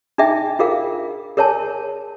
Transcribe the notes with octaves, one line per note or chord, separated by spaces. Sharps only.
D4 D#4 G#4 E5 G5
F4 G#4 A#4 F5
G#4 A#4 C#5 G#5 A5